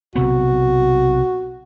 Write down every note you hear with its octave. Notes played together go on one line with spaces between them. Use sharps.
B1 C3 B3 F#4